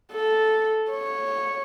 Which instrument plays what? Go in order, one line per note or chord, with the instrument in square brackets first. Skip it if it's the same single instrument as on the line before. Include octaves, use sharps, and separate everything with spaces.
[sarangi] A4
C#5